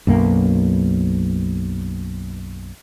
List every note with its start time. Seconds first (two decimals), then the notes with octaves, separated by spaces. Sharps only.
0.07 B1 F#2 A#3